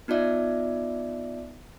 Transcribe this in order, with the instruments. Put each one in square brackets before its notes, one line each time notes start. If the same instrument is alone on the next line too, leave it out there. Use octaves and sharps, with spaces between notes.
[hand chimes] B3 D#4 F4 D5 E5